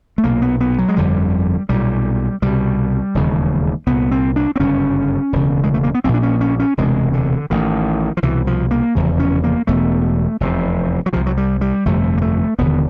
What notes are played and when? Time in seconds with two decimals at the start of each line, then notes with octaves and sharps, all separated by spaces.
0.18 A3
0.24 B1 A#2 A#3
0.42 B3
0.60 B3
0.78 F#3
0.89 G#3
0.96 G1 F2 D3 G3
1.69 B1 A#2 G3
2.42 C2 B2 G3
3.14 E1 D#2 C#3
3.87 C2 B3
3.92 A#2
4.11 C4
4.36 D4
4.56 C4
4.59 G1 F#2 C#3 C#4
5.33 E1 D2 C#3
5.63 G#3
5.74 A3
5.84 A#3
5.94 B3
6.04 A#1 A#2 C4
6.14 D4
6.23 C#4
6.41 C#4
6.59 C#4
6.77 E1 D2 C3 G#3
7.13 D3
7.50 A1 A2 D#3
8.17 F3
8.22 C2 B2 E3
8.47 F3
8.71 A#3
8.95 F1 E2 C#3
9.19 C#4
9.44 A#3
9.67 E1 E2 B2 A3
10.40 F1 E2 C3
11.06 F#3
11.13 C2 C3 F3
11.26 F#3
11.37 G3
11.61 G3
11.85 G1 F2 C3 A3
12.18 A#3
12.22 A3
12.58 E1 D#2 D3 B3